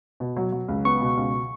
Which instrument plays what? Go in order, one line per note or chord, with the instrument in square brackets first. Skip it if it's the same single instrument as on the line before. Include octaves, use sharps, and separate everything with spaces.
[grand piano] B2
F#3
F#3
C#2
[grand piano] B3 [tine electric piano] C#6
[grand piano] B2
C#2